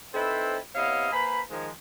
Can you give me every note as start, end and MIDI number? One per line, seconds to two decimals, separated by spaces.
0.13 0.57 60
0.13 0.57 63
0.13 0.57 64
0.13 0.57 69
0.13 0.57 71
0.13 0.57 72
0.75 1.07 48
0.75 1.07 59
0.75 1.07 64
0.75 1.07 73
0.75 1.07 75
0.75 1.07 77
1.12 1.40 58
1.12 1.40 71
1.12 1.40 72
1.12 1.40 80
1.12 1.40 83
1.49 1.69 51
1.49 1.69 53
1.49 1.69 56